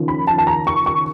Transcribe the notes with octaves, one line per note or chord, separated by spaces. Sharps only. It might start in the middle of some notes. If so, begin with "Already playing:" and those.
Already playing: D#2 C#3 F3
B5
A5
A5
A#5
C#6
C#6